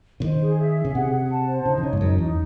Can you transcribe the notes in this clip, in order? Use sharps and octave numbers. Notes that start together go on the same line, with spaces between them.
C#3
D#3 C5
G#4
E5
G#4
C#3
C3 F#5
F#5
A5
C5
C#3 D#4
D#3
C#3 C#5
G#2
F#2 D#4
E2 D#4